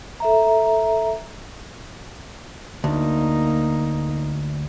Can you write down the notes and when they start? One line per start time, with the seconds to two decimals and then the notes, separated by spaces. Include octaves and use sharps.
0.20 A4 E5 A#5
2.84 D2 A#3 D#4